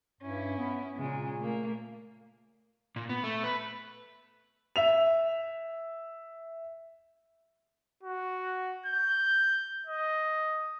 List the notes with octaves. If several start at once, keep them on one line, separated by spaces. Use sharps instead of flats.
G2 C#4 E4
B3
A#2 C#3 G#3
A3 A#3
A#2
B3
A3
B4
E5 F7
F#4
G6
D#5